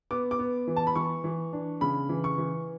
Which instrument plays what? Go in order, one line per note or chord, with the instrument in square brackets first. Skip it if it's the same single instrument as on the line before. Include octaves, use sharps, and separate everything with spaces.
[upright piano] B3 D6
D6
B3
E3
A5
B5
E3 C#6
E3
D4
C#3 B5
E3
C#6
E3